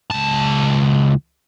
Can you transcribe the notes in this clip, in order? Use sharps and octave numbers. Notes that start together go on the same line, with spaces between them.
C#2 A5